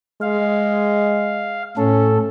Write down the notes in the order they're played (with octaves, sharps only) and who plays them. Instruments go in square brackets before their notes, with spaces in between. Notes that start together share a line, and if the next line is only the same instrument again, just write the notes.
[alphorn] G#3 [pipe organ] F5
[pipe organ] A2 A4 [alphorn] C#4